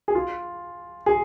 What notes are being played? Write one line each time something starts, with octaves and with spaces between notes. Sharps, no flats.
G#4
F4
G#4